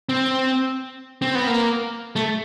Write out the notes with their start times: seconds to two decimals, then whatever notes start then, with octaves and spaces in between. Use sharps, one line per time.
0.09 C4
1.22 C4
1.35 B3
1.47 A#3
2.16 A3